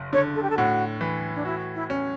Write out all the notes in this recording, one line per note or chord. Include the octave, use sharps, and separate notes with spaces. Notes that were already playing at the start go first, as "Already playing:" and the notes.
Already playing: F#1
D3 C#5
A4
G4
A4
A2 F#4
E3
D4
E4 F#4
E4
C#4